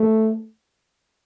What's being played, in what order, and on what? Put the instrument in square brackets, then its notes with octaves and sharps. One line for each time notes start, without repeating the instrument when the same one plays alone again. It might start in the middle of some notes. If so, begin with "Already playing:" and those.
Already playing: [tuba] A3